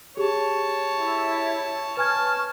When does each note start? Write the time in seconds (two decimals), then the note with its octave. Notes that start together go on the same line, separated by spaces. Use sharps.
0.17 G4 G#4 C#5 A5
0.95 E4
1.97 B4 G#5 A5 C#6 F6 G#6